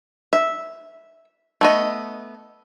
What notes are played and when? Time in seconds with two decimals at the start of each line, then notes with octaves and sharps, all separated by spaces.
0.33 E5
1.61 A3 B3 D#5